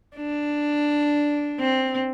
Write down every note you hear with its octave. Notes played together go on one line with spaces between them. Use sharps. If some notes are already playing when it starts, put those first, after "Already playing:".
D4
C4